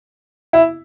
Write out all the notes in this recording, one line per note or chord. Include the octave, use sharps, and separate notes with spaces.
E4